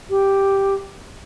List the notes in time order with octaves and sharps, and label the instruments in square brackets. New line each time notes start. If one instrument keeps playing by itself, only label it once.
[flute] G4